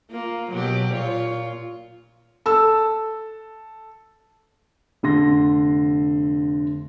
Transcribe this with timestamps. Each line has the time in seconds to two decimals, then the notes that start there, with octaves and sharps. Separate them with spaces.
0.11 A#3 F4
0.50 B2 F#3 G4
0.94 A#2 F4 C#5
2.46 A4 E6
5.03 F1 D3 C6 A#6